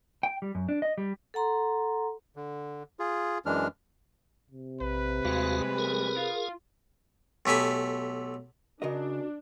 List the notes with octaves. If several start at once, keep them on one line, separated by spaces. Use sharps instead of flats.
G5
G3
F#2
D4
D#5
G3
A4 F#5 A#5 C6
D3
F4 G#4
F#2 E3 G#3 D4 F6
C3
A#1 B4
D#2 G3 G#3 F#4 F5
G#4 A#4
F4
B1 A3 G4 G#5 B5
C#3 D4 F#4 A#4 D#5